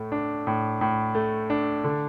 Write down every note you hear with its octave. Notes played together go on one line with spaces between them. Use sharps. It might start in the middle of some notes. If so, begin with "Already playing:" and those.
Already playing: A2 A3
D4
A2
A2
A3
D4
D3